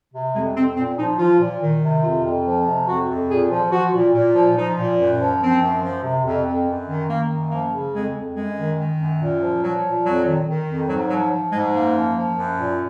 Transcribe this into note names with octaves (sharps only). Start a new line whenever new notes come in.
C3
F2 G#3
F2 C4
A#2 C4
F3 D#4
F3 F4
A#2
D#3
C3
F2 F4
F2
F3
C3
F2 F#4
F2
A#2 G#4
F3
F3 F#4
A#2
A#2
F3
F3 D#4
A#2
F#2
F3
F3 C4
F#2
F3
C3
F2
F2
F#2
D#3
D#3 A#3
F#2
F3 A#3
C#3
F2 G#3
F2
F#2 G#3
D#3
D#3
F#2
A#2
F3
F3 F#3
A#2
F2 F#3
D#3
D#3
F2
G#2 F#3
F3 F#3
F3
G#2 G#3
F#2 A#3
F3
F3
F#2
A#2